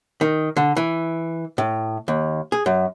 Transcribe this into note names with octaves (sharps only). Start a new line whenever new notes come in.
D#3
D3
E3
A2
D#2
G#4
F#2